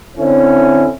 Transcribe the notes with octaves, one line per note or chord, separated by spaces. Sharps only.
D3 C4 C#4 E4